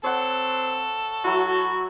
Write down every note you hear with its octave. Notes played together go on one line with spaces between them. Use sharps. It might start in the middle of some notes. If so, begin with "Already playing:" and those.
C4 A4 C#5 F#5
F#3 E4 F#4